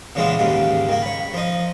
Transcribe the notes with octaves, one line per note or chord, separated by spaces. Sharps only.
A#2 C#3 E3 G#3 B3
D#2 G#2 C#3 D6
D#3 A#3
C#5 B5
F3 D#4